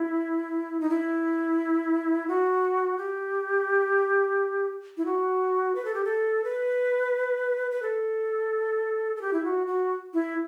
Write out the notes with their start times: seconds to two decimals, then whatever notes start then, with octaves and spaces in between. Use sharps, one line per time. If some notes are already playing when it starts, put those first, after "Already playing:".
Already playing: E4
0.80 D#4
0.90 E4
2.28 F#4
2.98 G4
4.97 E4
5.06 F#4
5.75 B4
5.85 A4
5.94 G4
6.05 A4
6.44 B4
7.71 B4
7.83 A4
9.16 A4
9.21 G4
9.33 E4
9.44 F#4
9.67 F#4
10.14 E4